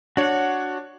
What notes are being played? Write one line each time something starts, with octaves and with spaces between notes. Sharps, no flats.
D4 F#4 C#5 F#5